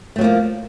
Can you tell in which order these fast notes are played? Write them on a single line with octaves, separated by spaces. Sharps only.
A3 F#3 F3 A#3